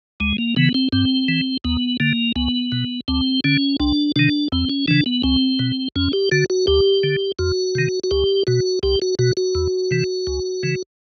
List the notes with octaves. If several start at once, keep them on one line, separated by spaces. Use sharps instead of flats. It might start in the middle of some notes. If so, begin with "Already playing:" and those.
D2 G#3
A#3
C#3 E3 B3
C4
G2 C4
E3
D#2 B3
D3 A#3
C#2 B3
B2
D2 C4
D3 C#4
C2 D4
C3 D#3 D4
E2 C4
C#4
C#3 E3 D4
B3
C#2 C4
B2
F2 C#4
G4
D3 F#4
F#4
D2 G4
D3
F2 F#4
C3 D#3
F#4
C#2 G4
B2 F#4
C2 G4
F#4
B2 F#4
F#4
E2
C3 E3
C#2
C#3 E3